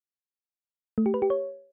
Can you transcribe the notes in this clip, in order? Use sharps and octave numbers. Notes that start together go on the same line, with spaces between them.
A3
G4
B4
G4
C#5